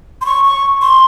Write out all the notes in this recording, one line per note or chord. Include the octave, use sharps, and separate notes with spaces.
C6
C#6
C#6
C6